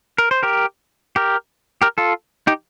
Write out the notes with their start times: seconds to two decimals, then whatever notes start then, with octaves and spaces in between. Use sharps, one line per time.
0.18 A#4
0.31 C5
0.43 G4 A#4
1.16 G4 A#4
1.82 G4 A#4
1.98 F4 A4
2.47 D#4 G4